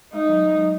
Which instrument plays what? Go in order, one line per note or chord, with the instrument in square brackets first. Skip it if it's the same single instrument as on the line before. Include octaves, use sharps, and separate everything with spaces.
[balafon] G#3 [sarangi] D#4
[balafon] F#3
G#3
F#3